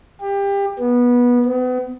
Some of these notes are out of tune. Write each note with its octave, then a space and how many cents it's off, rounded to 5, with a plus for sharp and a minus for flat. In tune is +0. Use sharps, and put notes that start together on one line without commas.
G4 +25
B3 -20
B3 +35